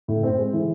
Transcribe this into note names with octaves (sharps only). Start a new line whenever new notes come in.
A2
C4
G#3
E3